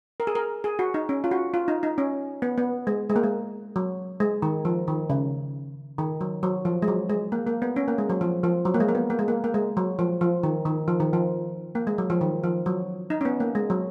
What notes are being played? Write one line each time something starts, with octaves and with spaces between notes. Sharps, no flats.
A#4
G#4
A#4
G#4
F#4
D#4
C#4
F4
F#4
F4
D#4
D#4
C#4
B3
B3
G#3
G#3
A#3
G#3
F#3
G#3
D#3
F3
D#3
C#3
D#3
F#3
F#3
F3
G#3
F#3
G#3
A#3
A#3
B3
C#4
A#3
G#3
F#3
F3
F3
F#3
A#3
G#3
A#3
B3
A#3
G#3
A#3
A#3
G#3
F#3
F3
F3
D#3
D#3
F3
D#3
F3
A#3
G#3
F#3
F3
D#3
F3
F#3
D#4
C#4
B3
A#3
G#3
F#3